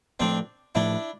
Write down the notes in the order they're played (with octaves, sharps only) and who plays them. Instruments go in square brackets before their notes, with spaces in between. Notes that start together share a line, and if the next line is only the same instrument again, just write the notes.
[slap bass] A2 F3 A3 [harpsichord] C4 D4
[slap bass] A2 F3 A3 [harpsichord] D4 E4